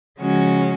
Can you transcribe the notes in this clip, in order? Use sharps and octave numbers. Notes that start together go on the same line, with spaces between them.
C#3 F3 G#3 C#4 F#4